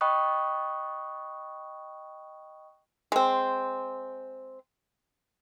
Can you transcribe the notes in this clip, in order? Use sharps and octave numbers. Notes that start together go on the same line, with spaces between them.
D#5 G5 B5 C#6 D#6 F#6
G#3 C4